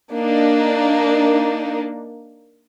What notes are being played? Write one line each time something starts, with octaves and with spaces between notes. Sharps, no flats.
A#3 D4 D#4